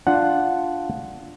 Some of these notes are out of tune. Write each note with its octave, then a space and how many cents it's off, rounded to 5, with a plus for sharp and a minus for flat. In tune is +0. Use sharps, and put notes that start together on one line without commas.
D4 +0 F4 +0 F#5 +0